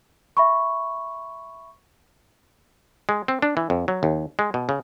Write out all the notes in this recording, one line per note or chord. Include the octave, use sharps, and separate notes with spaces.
E5 B5 C#6
G#3
C4
D4
E3
F2
F#3
D#2
G#3
B2
C#3